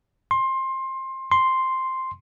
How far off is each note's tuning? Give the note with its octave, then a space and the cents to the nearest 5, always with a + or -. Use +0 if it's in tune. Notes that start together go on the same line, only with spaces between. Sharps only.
C6 +20
C6 +0